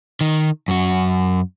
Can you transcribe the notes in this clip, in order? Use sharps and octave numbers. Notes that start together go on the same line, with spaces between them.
D#3
F#2 F#4